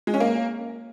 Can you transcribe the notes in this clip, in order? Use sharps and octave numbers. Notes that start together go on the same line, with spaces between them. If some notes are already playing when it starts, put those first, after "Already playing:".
G#3
C#4
A#3